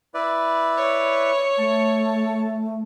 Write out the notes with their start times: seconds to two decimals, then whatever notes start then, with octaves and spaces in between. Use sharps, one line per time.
0.14 E4 B4 D5
0.77 C#5
1.58 A3 A5